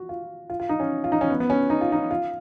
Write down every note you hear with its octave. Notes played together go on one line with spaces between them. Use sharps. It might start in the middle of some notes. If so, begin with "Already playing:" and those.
Already playing: F#4
F4
F4
F4
D#4
C#4
F4
D#4
C#4
B3
B3
C#4
D#4
F4
D#4
F4